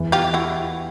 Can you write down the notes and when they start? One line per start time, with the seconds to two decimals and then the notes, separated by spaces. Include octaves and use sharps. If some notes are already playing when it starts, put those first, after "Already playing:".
Already playing: E2 E3
0.12 F4 G4
0.34 E4 F#4